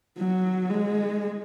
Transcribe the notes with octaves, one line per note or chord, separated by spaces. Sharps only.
F#3
G#3